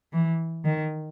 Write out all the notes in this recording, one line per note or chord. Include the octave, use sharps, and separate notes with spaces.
E3
D#3